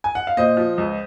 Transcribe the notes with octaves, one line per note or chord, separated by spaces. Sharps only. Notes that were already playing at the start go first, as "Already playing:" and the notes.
G#5
F#5
F5
A#2 C5 D#5
F3
C#2